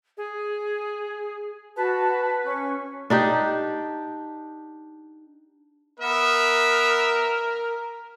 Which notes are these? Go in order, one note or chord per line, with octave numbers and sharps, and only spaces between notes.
G#4
F#4 B4 A5
C#4 C#6
D4 D#4 G4
B3 A#4 E5